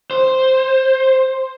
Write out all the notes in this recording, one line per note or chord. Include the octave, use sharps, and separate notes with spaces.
C5